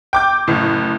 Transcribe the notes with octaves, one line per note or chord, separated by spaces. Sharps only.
G5 D6 G6
F#1 A2